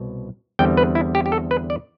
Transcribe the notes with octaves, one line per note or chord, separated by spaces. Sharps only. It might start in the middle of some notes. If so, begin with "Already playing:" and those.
Already playing: C2 B2
E2 D3 G3 C4 G5
B4
E4
G4
G4
A4
B4
D5